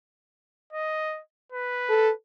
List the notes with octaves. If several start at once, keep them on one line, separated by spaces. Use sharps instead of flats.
D#5
B4
A4